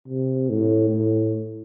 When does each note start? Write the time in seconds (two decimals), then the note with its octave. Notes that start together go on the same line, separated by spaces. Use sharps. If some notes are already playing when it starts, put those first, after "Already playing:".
0.08 C3
0.49 A2
0.90 A2